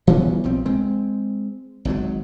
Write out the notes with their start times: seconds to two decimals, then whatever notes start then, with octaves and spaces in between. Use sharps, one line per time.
0.07 E3 G3 B3 C#4
0.44 B1 F3 C4
0.66 G#3 C4
1.85 G#1 G#2 C#3 F#3